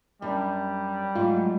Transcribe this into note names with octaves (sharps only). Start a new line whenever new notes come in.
F#2 G3 D4
G#2 F#3 A3 F4